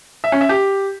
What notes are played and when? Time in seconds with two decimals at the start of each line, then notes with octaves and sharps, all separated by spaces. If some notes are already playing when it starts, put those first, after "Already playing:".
0.24 E5
0.32 C#4
0.41 E5
0.49 G4